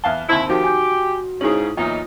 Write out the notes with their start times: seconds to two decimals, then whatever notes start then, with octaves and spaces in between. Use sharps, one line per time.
0.04 E2 E5 F5 A5 F#6 G7
0.29 D#2 C3 E4 C5 A5 C6 E6
0.50 D#3 F3 F#4 G4
0.64 D#3 G#5 D6 G6
1.41 G#2 C#3 C#4 D#4 E4 G#4 F#7
1.77 E2 A#2 F#3 D#4 F4